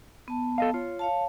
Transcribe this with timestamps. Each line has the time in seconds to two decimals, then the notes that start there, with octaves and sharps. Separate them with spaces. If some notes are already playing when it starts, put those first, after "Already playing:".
0.28 B3 A5
0.58 A4 D#5 F5
0.74 F4 C#5
0.99 C#5 F5 A5